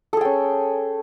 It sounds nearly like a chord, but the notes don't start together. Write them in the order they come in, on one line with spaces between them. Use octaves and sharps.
A4 G#4 G5 C#4